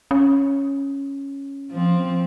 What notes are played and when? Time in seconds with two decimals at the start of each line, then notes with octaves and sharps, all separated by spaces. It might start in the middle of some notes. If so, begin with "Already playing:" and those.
0.11 C#4
1.71 F3 C4